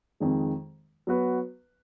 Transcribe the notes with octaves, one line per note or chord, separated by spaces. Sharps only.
F2 D#3 G#3
F#3 B3 F#4 B4